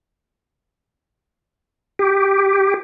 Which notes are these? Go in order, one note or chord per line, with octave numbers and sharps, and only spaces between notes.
G4